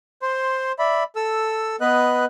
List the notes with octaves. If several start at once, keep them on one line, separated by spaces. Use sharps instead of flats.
C5 C6
D5 E5 B5
A4 E6
B3 B4 D#5 F#6